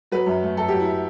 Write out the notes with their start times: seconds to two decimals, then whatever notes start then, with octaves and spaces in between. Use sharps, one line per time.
0.12 F#3 B4
0.26 F#2
0.43 A3
0.57 F#2 A4
0.68 F#3 G4
0.80 E4